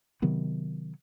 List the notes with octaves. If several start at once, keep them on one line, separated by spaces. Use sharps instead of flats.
C3 D#3 F#3 B3